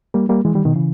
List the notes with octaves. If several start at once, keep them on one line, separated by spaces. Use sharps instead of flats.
G3 A#3
G3 A#3
E3 G#3
D#3 G3
B2 D#3
C#3 E3